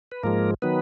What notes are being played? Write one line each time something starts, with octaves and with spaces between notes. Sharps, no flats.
B4
G#2 F3 G#3 A#3 A#4
D#3 F#3 B3 B4